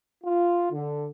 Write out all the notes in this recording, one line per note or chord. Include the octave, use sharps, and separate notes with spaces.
F4
D3